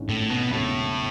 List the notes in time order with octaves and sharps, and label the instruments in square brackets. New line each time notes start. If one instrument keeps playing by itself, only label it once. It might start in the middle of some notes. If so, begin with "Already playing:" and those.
Already playing: [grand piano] G#1 G#2 G#3 C#4 E4
[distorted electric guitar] A2
B2
[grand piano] E1 E2 C#3 F#3 C#4 [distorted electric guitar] A2